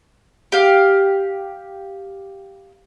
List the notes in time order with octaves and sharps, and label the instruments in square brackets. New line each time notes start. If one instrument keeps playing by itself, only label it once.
[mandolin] G4 F5